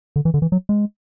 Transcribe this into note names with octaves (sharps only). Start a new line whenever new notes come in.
D3
E3
D3
E3
F#3
G#3